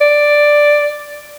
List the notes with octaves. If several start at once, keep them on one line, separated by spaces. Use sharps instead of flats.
D5